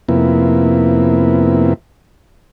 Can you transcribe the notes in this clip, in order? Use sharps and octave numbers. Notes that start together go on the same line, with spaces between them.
F2 C3 A#3 B3 E4